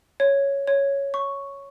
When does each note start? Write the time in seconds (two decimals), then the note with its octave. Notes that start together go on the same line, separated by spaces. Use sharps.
0.20 C#5
0.67 C#5
1.14 C#6